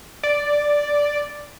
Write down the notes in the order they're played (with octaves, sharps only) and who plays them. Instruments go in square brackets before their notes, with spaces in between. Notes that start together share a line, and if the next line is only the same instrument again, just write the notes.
[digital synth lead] D5